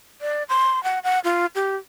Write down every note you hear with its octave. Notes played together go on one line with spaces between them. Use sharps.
D5
C6
F#5
F#5
F4
G4